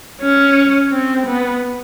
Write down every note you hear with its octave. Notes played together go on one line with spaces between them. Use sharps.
C#4
C4
B3